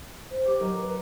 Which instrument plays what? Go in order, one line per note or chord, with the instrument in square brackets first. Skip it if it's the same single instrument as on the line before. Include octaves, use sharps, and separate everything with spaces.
[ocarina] C5
[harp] G4 D6
[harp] F#3 D#4 [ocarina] A#4
[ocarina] B4